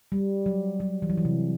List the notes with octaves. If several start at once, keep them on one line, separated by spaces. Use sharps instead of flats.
G3
F#3
F#3
E3
F#3
E3
C3